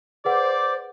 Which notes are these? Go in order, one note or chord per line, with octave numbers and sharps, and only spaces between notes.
G#4 B4 C5 D5 F#5 D6